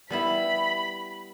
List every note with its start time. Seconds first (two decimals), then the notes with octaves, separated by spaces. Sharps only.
0.10 G3 B3 E4 B5